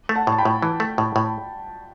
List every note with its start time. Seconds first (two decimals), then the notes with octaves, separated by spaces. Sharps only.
0.09 A3
0.15 F#5 A5
0.27 A2 A5
0.38 G5 B5
0.45 A2
0.62 E3
0.80 A3
0.98 A2
1.16 A2